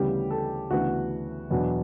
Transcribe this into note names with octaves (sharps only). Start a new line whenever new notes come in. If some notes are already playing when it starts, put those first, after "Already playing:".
Already playing: D2 C#3 E3 G3 B3 G4
A4
D2 C#3 E3 B3 D4 F#4
E2 B2 F#3 B3 D4